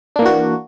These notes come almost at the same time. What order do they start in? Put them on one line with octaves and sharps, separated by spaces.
D4 A#3 E3 F#4